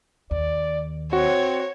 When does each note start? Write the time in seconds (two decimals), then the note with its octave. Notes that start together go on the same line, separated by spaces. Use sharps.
0.31 D#2 D5
1.13 C4 F#4 C#5